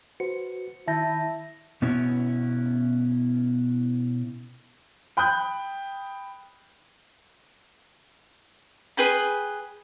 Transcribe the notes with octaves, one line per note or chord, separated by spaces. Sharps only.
F#4 B4 C5 C#7
D#3 E4 E5 A5 G6 A6 A#6
B2 B3 C#4 E4
G5 B5 D#6 F#6 G6
G#4 B4 G5 B5